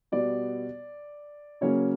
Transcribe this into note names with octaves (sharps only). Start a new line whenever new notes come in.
B2 G3 B3 D5
C#3 F#3 A#3 C#4 C#5